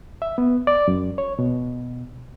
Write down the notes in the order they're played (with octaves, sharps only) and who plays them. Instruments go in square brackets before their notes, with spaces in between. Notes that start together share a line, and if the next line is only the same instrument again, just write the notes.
[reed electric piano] E5
B3
D5
F#2
C#5
B2